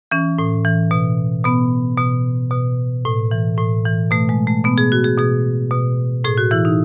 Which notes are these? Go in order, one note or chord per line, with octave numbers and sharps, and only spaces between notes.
E3 C#4
A2
E3
B2
B2 B3
B2
B2
A2
E3
A2
E3
B2 A3
G#3
A3
B2 B3
G#4
F#4
G#4
B2 G#4
B2
A2 G#4
F#4
E3 E4
D#4